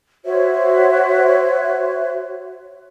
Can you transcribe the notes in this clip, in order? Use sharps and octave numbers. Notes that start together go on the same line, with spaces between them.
F#4 C5 C#5 E5